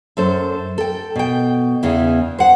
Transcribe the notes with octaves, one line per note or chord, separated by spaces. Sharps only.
F#2 A4 C5
A4 G5
B2 G5
E2 C#3 E3
C5 F#5